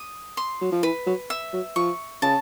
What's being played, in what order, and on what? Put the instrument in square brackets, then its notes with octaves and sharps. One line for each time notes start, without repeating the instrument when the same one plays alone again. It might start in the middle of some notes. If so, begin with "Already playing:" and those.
Already playing: [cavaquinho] D#6
C6
[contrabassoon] F#3
F3
[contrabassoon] E3 [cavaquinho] B4
[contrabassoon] F#3
[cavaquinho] E5
[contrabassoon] F#3
[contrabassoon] F3 [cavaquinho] C#6
[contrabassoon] C#3 [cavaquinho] A5